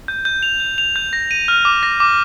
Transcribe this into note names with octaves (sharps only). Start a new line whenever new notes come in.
G6
G6
F7
G6
F7
G6
A#6
D#7
F6
D6
A#6
D6